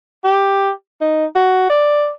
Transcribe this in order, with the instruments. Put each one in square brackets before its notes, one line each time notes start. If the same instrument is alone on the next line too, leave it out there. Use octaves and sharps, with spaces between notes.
[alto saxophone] G4
D#4
F#4
D5